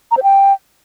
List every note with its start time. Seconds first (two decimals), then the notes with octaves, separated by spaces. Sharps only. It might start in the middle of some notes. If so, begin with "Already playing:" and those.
0.11 A#5
0.17 C5
0.23 G5